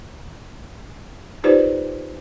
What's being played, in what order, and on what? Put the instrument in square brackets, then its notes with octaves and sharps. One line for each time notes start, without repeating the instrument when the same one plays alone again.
[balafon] D#4 F4 G4 B4 C5 D5